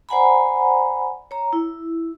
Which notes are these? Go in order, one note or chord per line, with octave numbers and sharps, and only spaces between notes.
C5 D5 F#5 G#5 A#5 B5
C#5 A#5
E4